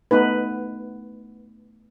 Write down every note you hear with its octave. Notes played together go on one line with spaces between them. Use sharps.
A3 B3 D#4 B4